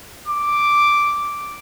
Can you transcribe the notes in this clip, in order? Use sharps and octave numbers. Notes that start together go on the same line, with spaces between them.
D6